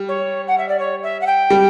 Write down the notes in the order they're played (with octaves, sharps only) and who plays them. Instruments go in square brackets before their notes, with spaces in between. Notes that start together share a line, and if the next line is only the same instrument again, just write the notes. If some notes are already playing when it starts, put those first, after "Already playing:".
Already playing: [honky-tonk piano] G3
[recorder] C#5
F#5
E5
D5
C#5
E5
F#5
G5
[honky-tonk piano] G3